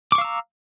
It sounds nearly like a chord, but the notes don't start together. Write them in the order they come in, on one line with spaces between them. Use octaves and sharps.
D6 C#6 F5 E6 A#5